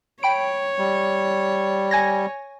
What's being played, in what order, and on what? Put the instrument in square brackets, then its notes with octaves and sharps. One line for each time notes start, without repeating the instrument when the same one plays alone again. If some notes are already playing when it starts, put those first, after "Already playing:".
[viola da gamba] C#5 [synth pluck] G5 B5 D7
[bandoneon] G3
[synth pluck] G#5 G#6 A#6